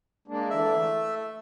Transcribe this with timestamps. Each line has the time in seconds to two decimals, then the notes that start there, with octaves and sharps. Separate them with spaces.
0.28 G#3 A#3 D4
0.50 D3 E3 D4 E5
0.75 A3